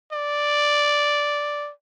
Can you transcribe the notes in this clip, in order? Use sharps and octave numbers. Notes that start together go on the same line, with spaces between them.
D5